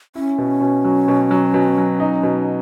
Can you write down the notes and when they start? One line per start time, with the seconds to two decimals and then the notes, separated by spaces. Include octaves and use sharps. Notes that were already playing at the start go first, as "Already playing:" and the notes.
0.15 C#4 E4
0.38 B2
0.61 B2
0.84 F#3
1.08 B2
1.31 F#3
1.54 B2
1.78 F#3
2.00 D#4
2.23 B2